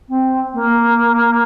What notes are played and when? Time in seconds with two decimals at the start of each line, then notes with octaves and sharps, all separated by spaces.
0.09 C4
0.54 A#3